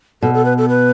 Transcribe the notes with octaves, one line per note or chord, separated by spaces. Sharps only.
B2 A4
A4
B4
A4
B4